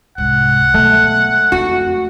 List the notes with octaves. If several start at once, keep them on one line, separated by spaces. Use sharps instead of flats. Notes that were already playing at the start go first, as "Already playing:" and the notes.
C2 G#2 F#5
B2 A3
F2 F#4